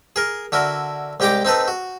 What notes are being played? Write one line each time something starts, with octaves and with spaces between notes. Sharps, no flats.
G#4 A#4
D3 E4 F#4 A#4
C2 G#3 G4 G5 A#5 D6
C4 D#4 A4 B4
F#4